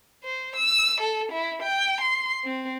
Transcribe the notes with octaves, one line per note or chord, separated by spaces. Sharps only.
C5
E6
A4
E4
G5
C6
C4